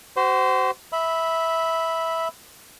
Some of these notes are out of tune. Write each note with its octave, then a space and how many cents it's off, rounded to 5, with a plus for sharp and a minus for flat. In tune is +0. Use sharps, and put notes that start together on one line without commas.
F#4 +35 C5 -20
E5 -10 B5 +0